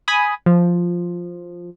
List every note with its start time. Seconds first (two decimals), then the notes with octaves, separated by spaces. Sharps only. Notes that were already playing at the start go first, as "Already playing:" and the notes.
0.08 G#5 B5 D#6
0.46 F3